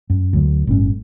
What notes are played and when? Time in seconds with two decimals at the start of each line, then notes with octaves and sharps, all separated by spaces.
0.10 F#2
0.33 D2 F#3
0.67 G1 A2 C#4